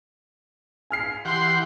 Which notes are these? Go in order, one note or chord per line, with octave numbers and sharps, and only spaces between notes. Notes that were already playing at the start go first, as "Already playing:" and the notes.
G#5 F6 C7
E3 G4 F#5 C6